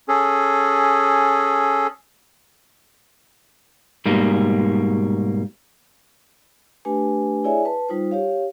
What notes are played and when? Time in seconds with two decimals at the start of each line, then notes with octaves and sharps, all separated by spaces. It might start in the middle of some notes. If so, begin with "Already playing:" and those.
0.08 C#4 G#4 A4
4.06 G#2 B2 G3 A#3
6.85 A3 D4 G4 B4 G#5
7.44 E4 G#4 C#5 D5 E5 G#5
7.65 B4 A5
7.89 G3 D#4 F4 C5
8.11 G4 C#5 F5